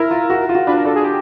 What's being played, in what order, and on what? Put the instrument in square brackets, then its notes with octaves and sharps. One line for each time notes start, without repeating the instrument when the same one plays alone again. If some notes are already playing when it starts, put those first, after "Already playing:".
Already playing: [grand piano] E4 [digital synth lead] A#4
[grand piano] F4
F#4
F4
F#4
[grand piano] D4 [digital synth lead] B4
[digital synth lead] A#4
[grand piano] D4 [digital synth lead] A4
[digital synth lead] G#4
G4